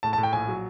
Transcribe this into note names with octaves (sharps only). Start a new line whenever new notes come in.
A2 A5
A5
A2
G5
A#1 G#5
F#3